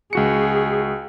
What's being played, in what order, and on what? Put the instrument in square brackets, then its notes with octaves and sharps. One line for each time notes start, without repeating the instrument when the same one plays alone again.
[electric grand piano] C#2 F#4 C#7 [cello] G#4